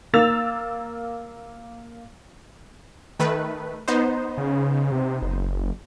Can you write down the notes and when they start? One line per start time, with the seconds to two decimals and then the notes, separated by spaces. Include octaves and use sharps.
0.13 A#3 A#4 E6 A6 F7
3.19 D#3 A3 B4
3.88 B3 D#4 C5
4.38 C#3
4.92 C3
5.22 F#1